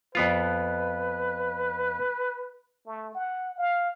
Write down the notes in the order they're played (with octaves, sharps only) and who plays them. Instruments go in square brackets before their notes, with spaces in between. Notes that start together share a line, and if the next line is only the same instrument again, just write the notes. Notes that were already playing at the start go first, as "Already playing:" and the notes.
[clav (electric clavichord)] F2 B3 F4 [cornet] B4
[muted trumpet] A3
F#5
F5